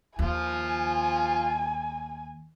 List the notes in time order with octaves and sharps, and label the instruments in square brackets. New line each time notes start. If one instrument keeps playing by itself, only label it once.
[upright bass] D#2 [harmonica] F3 F4 [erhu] G#5